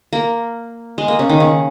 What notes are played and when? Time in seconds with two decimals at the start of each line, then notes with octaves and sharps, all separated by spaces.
0.13 A#3
0.98 G#3
1.08 A#3
1.19 C#3
1.29 D#3
1.40 C#3